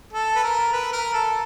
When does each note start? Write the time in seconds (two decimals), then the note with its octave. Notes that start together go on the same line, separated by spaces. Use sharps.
0.13 A4
0.36 B4
0.43 A#4
0.73 B4
0.93 A#4
1.13 A4